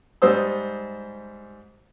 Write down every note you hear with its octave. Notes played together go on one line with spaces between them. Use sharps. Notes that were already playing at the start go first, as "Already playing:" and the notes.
G#2 G3 C5 D#6 E6